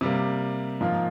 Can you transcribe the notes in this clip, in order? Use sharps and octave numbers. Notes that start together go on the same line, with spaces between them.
C3 G3 A#3
G#2 F3 A#3 F4